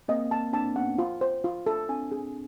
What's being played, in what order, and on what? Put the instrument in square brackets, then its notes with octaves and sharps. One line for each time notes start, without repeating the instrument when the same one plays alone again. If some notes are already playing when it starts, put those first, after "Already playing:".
[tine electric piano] A#3 C4 [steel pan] D#5
[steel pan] A5
[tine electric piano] C4 D4 [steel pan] A5
[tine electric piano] B3 C#4 [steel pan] F#5
[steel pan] F4
C5
F4
A4
[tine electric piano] C4 D4 [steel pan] G#5
[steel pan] G#4